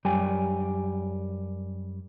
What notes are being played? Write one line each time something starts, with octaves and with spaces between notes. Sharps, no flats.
F#2 G3 G4 G5 G#5